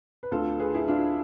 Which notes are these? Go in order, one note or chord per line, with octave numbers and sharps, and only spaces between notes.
B4
D2 D3 F4 A4
G#4 B4
E4 G#4
D4 F4